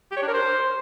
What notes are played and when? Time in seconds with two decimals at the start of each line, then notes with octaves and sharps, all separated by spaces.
0.11 G4
0.17 C#5
0.22 D4
0.28 A#4
0.33 C5